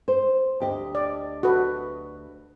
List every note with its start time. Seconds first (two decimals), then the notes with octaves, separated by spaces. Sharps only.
0.08 C5
0.60 D2 G4 D#5
0.95 D5
1.43 F#4 A4 B4